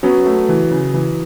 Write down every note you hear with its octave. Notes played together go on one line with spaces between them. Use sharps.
F#3 B3 C#4
A3
E3
C#3
E3